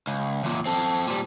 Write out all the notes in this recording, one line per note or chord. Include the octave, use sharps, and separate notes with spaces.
C#2
E2 A#2
C4 A4
A#2 G3